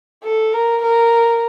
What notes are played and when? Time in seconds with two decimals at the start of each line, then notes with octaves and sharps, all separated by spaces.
0.24 A4
0.53 A#4
0.82 A#4